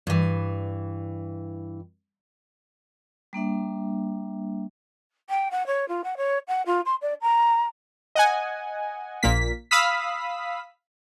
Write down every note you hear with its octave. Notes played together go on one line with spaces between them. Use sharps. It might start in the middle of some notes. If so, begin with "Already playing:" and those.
G2 E3
G3 A#3 D4 E5
G5
F#5
C#5
F4
F#5
C#5
F#5
F4
C6
D5
A#5
D#5 F#5 G#5
A#1 A#2 A#3 B6
F5 B5 D#6 E6 B6